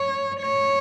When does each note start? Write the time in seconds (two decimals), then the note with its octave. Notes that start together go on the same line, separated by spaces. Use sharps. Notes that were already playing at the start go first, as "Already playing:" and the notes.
Already playing: C#5
0.40 C#5